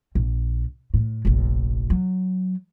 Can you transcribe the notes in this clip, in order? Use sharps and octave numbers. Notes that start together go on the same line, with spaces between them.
A#1
A2
F1 A#1
F#3